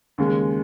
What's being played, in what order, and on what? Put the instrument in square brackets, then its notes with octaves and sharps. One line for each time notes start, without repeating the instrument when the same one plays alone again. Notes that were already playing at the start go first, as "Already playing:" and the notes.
[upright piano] D#2 C#3 G#3